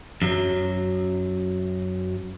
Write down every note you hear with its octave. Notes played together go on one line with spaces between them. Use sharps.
F#2 F#3